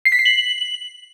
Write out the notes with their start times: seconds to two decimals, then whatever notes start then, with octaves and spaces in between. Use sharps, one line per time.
0.05 C7
0.12 B6
0.19 C7
0.25 F#7